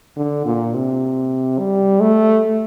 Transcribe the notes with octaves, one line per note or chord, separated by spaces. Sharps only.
D3
A#2
C3
G3
A3